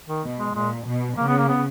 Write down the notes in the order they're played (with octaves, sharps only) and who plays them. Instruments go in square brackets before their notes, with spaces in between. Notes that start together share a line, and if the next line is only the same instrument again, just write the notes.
[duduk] D#3
[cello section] B2
[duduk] G#3
[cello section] A#2 [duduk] G#3
[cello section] B2
[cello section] C#3 [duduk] A#3
[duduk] B3
A#3
B3